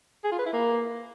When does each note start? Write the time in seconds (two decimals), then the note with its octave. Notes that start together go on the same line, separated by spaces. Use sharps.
0.24 G#4
0.31 F4
0.38 B4
0.46 E4
0.53 A#3